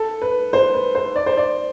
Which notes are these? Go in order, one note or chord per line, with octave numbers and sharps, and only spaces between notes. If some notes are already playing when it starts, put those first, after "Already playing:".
Already playing: A4
B4
C5
B4
C5
D5
C5
D5